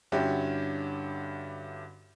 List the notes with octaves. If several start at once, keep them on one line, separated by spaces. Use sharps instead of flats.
G2 D3 C#4 E4 F#4 G4